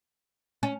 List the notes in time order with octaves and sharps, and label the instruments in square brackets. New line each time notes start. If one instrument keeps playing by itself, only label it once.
[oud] C#4